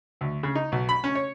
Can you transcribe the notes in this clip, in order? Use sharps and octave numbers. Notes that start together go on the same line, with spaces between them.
D2
C#3
D#4
B1
B5
C#4
C#5